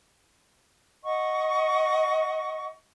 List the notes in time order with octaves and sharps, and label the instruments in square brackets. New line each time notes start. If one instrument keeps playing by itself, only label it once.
[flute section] D#5 F#5 C#6